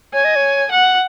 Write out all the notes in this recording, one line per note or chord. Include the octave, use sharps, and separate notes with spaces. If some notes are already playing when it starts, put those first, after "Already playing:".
C#5 G#5
D#5
C#5
F#5